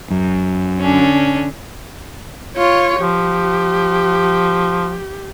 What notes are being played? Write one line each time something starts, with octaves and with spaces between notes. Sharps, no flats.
F#2
D3 C#4 D4
F4 C#5
F3 G4